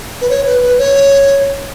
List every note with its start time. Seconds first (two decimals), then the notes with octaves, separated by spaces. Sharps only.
0.21 B4
0.29 C#5
0.46 B4
0.61 B4
0.78 C#5